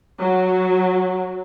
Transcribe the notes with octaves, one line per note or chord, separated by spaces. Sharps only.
F#3